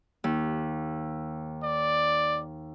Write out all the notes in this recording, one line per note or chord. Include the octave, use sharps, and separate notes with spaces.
D#2
D5